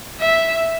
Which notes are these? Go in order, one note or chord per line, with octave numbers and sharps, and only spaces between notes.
E5